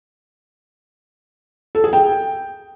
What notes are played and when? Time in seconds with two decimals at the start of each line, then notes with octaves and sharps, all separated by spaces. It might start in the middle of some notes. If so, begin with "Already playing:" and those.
1.75 A4
1.84 G#4
1.93 G5